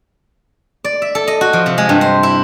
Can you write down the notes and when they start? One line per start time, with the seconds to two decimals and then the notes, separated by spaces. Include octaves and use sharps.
0.84 D5
1.02 E5
1.15 A4
1.27 D#5
1.41 F#4
1.53 F3
1.66 C3
1.78 G#3
1.89 G2
2.01 C5
2.23 E4